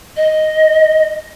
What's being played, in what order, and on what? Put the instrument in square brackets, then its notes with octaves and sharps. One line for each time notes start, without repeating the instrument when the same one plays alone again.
[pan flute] D#5